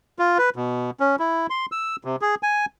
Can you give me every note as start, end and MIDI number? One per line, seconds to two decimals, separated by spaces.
0.19 0.38 65
0.38 0.50 71
0.56 0.91 47
1.00 1.16 61
1.19 1.47 64
1.50 1.66 84
1.72 1.96 88
2.05 2.16 48
2.22 2.35 68
2.43 2.66 80